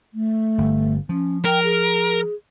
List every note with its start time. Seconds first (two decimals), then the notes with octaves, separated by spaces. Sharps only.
0.14 A3
0.58 G1
1.09 F3 C#4
1.45 A#4 G5
1.64 G#4